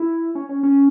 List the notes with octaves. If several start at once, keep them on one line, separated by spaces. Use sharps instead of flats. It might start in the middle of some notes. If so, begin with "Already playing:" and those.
Already playing: E4
C#4
C#4
C#4